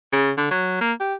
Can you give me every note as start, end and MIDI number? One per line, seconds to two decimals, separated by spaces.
0.13 0.31 49
0.38 0.48 50
0.51 0.81 54
0.81 0.93 58
1.00 1.15 67